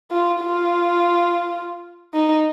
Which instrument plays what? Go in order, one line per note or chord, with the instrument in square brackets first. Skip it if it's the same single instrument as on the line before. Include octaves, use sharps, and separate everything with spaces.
[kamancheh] F4
F4
D#4